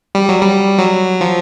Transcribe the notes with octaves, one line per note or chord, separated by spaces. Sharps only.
G3
F#3
G3
F#3
F3